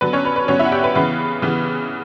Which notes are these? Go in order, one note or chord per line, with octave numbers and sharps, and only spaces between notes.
D3 F#3 B3 B4
C#4 C#5
B4
B4
D3 F#3 B3 C#4 C#5
E4 E5
F#5
G4 G5
B4
C#3 E3 B3 B4
C#3 E3 B3